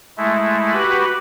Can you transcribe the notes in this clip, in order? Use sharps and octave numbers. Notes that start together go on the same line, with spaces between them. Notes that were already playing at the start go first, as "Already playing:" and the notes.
G#3 A3 E4
F#4 G4 B4 B5